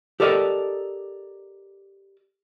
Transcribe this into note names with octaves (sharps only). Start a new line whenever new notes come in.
G4 A4 A#4 D5 D#5 A5